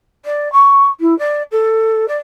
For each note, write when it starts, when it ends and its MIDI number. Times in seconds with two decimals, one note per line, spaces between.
0.25 0.51 74
0.52 0.86 85
1.00 1.16 64
1.18 1.42 74
1.51 2.08 69
2.08 2.17 74